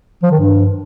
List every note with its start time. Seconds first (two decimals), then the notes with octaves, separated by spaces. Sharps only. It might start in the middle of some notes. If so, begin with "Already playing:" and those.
0.23 F3
0.31 D#3
0.39 G2